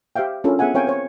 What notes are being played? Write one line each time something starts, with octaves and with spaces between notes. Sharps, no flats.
G4 C5 E5 F5 G5
C#4 D4 F4 A4 A#4
B3 G#4 E5 F#5 G#5
C4 A#4 C#5 F5 G5 G#5
C5 C#5